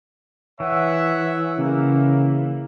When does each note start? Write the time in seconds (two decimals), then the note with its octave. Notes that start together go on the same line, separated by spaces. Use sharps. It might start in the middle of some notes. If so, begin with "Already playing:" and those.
0.60 E3 C#5 E5 F#5
1.58 C#3 A#3